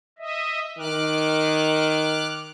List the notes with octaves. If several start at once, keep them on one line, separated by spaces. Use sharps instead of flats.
D#5 E5
D#3 D6 F6 F#6